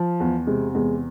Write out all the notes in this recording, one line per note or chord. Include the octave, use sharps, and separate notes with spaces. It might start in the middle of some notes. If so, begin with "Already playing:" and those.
Already playing: F3
E2
C3 G#3
E2 G#3